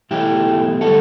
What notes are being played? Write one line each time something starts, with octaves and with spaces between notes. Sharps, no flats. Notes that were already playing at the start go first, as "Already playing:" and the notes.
E2 B2 F#3 A3 E4 G4
D3 G3 F#4 A4